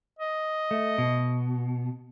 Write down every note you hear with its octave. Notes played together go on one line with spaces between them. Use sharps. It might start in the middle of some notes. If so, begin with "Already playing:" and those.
D#5
A3
B2